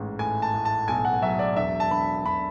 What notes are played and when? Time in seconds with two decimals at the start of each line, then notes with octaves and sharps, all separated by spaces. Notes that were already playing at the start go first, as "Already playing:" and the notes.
Already playing: A1 G#2
0.19 A2 G#5
0.42 A5
0.54 A2
0.65 A5
0.88 B1 G#5
1.05 F#5
1.22 F#3 E5
1.39 D5
1.56 E1 E5
1.80 A5
1.91 E1 B5
2.25 E1 B5